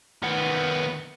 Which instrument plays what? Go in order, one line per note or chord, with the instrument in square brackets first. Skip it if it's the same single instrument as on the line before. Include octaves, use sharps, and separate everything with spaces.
[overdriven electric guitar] D#3 B3